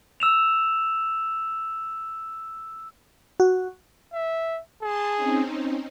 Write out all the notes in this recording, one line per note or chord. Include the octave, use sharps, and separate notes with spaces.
E6 E7 F7
F#4
E5
G#4 A5 C6
C4 C#4 D#4